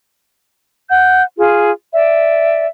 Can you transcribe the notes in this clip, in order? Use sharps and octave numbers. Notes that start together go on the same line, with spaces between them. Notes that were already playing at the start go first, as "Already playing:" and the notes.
F#5 G6
F4 G#4
D5 E5